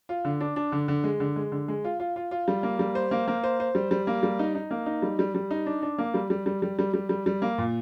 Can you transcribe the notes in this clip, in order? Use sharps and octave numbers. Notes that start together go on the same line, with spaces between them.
F4
D3
D4
D4
D3
D3
G#3
D3
G#3
D3
G#3
F4
F4
F4
F4
G3
A#3
G3
C5
A#3
A#3
C5
C5
G3
G3
A#3
G3
D#4
D#4
A#3
D#4
G3
G3
G3
D#4
D4
D4
A#3
G3
G3
G3
G3
G3
G3
G3
G3
A#3
A#2